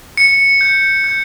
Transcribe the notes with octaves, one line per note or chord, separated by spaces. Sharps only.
C#7
G6
G6